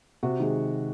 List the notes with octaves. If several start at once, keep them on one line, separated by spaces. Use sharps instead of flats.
C3 F#4
D#3 G#3